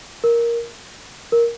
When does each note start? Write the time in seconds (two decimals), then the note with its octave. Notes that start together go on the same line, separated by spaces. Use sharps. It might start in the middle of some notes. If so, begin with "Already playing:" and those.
0.24 A#4
1.32 A#4